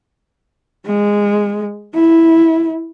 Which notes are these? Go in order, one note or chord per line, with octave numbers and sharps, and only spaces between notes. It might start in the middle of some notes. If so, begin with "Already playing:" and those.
G#3
E4